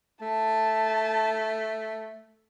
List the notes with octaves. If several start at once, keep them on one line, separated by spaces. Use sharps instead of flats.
A3 A5